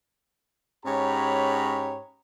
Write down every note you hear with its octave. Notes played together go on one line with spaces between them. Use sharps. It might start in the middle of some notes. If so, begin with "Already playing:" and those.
G#2 C#4 G4 C#5 A#5 B5